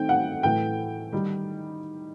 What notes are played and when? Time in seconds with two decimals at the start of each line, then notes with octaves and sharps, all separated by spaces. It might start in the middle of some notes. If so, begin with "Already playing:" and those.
Already playing: D#3 A3 C4 D#4 G5
0.09 F#5
0.43 A2 E3 A3 G5
1.12 D#3 G3 D#4